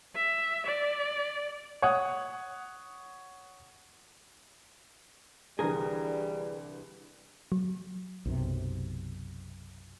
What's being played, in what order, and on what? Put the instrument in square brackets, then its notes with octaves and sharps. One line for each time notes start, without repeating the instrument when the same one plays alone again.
[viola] E5
D5
[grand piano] C#5 F#5 D#6
[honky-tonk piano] C2 D3 E3 [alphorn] G3 [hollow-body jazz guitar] G#4 A#4
[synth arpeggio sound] F#3
[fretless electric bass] B1 F#2 C3